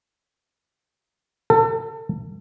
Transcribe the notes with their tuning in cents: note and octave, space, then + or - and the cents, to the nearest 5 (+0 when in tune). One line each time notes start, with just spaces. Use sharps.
A4 +35